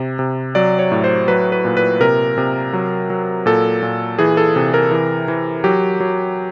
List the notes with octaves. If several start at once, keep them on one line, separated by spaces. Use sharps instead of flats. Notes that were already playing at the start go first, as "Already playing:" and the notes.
Already playing: C3
C3
F#3 D5
C#5
A2
C5
F#3 B4
B4
A#2
B4
C3 A#4
C3
F#3
F#3
A#2 A4
A#2
E3 G#4
A4
C3
A#4
E3
E3
F#3 G4
F#3